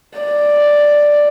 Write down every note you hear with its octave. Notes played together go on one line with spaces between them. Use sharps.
D5